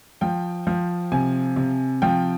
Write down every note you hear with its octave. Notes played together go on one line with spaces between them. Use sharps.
F3 G5
F3
C3 G#5
C3
F3 G5